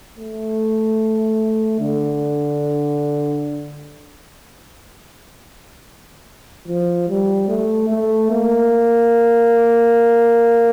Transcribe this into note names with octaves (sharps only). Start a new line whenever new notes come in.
A3
D3
F3
G3
A3
A3
A#3